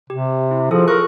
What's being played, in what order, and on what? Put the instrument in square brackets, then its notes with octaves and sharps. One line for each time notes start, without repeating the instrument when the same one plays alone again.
[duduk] C3 [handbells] G4
[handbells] E4
[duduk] F3 [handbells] F4 G#4 A4
[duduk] A#4 [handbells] C#6 F#6